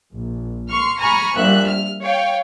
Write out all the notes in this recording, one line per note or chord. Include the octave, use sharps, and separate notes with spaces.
A#1
C6 C#6 F6
G#5 A#5 B5 C#6 F6
A#1 G3 E5 F#6
F6
C#5 F5 G5